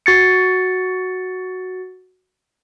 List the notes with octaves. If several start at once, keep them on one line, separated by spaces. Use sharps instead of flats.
F#4 A6 C#7